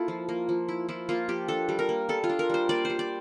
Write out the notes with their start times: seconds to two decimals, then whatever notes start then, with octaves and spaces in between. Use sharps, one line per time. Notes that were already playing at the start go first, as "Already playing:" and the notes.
Already playing: A#3 E4 F4 A4
0.08 F3
0.29 A#3
0.49 F3
0.69 E4
0.89 F3 E4
1.09 A#3 F4
1.28 F3 G4
1.48 D4 A4
1.69 G3
1.79 A#4
1.89 A#3
2.09 G3 A4
2.24 F4
2.29 D4
2.39 A#4
2.50 G3 C5
2.69 A#3 D5
2.85 G3 C5
2.99 D5